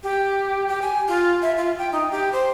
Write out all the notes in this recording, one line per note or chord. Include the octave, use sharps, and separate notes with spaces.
G4
G4
G#5
F4
E5
F4
G5
D#4
G4
C5